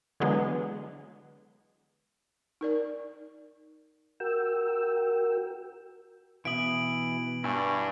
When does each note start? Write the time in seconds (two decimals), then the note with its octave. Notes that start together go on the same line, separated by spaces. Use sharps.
0.20 D3 E3 F#3 G#3 B3
2.61 D#4 A#4 D5
4.20 F#4 A#4 G5 E6
6.45 B2 E3 E5 D#6 D7 F#7
7.44 G2 E4 G#5 C#6